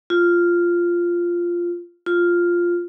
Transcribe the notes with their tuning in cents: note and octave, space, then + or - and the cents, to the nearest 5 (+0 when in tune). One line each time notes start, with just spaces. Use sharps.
F4 -5
F4 +0